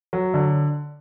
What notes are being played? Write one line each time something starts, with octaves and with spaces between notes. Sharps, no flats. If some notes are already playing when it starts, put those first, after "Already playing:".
F#3
D3